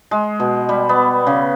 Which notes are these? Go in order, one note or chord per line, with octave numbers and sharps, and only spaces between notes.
G#3
B2
G3
B3
C#3